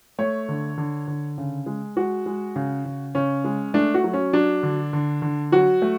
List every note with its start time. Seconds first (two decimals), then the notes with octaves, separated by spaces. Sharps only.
0.19 A3 C#5
0.49 D3
0.78 D3
1.08 D3
1.38 C#3
1.66 G#3
1.97 G#3 F#4
2.26 G#3
2.56 C#3
2.85 C#3
3.15 C#3 C#4
3.44 G#3
3.74 A3 D4
3.94 F#4
4.04 F#3
4.13 C#4
4.33 F#3 D4
4.63 D3
4.93 D3
5.22 D3
5.52 F#3 F#4
5.82 A3